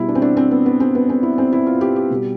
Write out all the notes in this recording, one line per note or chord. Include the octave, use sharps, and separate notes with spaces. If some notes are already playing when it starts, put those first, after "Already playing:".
Already playing: B2 G3 E4
D4
C4
D4
C4
B3
B3
C4
B3
C4
E4
C4
E4
F4
G4
G4
B2 G3